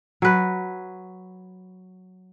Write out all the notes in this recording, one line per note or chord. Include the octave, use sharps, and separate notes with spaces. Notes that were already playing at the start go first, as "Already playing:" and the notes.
F#3 B4